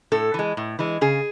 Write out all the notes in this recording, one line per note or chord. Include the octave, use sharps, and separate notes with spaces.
A2 A4
E3 G#3
A2
E3 G#3
C#3 G#4